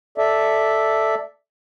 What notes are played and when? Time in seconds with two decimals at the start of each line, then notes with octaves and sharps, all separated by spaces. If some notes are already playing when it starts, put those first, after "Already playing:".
0.18 A4 D5 E5